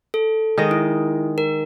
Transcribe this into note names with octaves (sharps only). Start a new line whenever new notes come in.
A4
D#3 G#3 D#5
E4
A#4